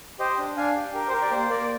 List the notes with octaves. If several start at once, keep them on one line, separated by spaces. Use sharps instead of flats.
G4 C5 D#5
D4
D4 F5 G#5
G4
G4 A#4
C5
G4 A#4
D5
A#3 C5
A#3 A#4 D5